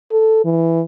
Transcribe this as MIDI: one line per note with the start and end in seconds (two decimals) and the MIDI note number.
0.12 0.44 69
0.45 0.82 52